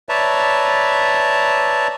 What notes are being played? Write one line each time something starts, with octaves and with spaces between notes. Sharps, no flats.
B4 C#5 D5 E5 A5 A#5